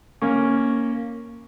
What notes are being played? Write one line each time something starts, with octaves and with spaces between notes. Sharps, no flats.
A#3 C#4